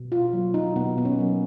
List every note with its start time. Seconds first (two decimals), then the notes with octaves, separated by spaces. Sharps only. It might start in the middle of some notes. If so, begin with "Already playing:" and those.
Already playing: B2
0.12 F4
0.33 F#3 A#3
0.54 D#4
0.76 B2 B3
0.98 B3
1.05 C#4
1.19 F#3 A#3